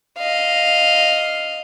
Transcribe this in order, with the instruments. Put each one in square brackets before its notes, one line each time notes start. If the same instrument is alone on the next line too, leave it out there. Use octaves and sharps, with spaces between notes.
[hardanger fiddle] D#5 F5